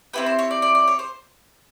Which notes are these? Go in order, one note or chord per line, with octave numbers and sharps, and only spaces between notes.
C4 E4 G4 B4
C5
C#5
D5
D5
D5
C#5
C5